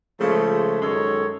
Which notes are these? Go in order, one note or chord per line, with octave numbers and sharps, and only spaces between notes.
C#3 F3 G#3 A3
F#2 D#3 G#3 A4 C#5